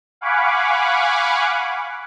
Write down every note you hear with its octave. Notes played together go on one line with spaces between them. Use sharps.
F5 F#5 G#5 B5 C#6 D6